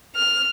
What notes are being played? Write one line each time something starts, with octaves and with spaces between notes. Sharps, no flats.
F6